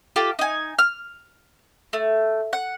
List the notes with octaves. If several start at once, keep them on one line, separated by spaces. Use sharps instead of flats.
F4 G4 A4
D#4 G#5
F6
A3
F#5